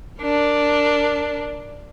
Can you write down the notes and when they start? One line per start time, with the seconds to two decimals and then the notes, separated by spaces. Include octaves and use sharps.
0.21 D4 A#4